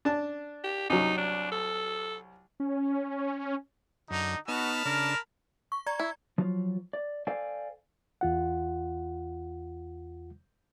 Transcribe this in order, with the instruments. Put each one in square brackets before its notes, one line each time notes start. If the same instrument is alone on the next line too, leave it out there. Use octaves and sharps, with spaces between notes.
[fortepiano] D4 A5
[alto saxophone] G4
[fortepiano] C2 F#3 [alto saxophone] D#4
[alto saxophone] D4
A4
[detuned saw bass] C#4
[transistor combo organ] F#2 [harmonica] D3 [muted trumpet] D#4
[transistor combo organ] B3 D#4 [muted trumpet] F#4 [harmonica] A5 B5 F6
[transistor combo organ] C#3 D4 [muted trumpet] A#4
[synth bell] C#6
D5 A#5 G#6
[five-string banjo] E4
[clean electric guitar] F3 F#3 F4
D5
A4 C5 D5 F5 G5 G#5
[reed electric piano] E2 F4 F#5